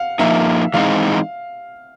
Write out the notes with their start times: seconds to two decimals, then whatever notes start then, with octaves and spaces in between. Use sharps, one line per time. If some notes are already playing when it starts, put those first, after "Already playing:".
Already playing: F5 F#5
0.19 F3 A#3 D#4 E5
0.74 E3 G#3 C4 D#4 F5